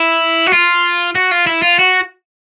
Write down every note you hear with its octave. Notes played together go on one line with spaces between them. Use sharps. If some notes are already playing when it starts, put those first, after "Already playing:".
Already playing: E4
F#4
F4
F#4
F4
E4
F4
F#4